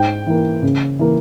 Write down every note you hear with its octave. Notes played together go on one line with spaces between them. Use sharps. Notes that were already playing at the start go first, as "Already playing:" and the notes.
Already playing: G#2 G5
E3 A#3
C#3
E3 A#3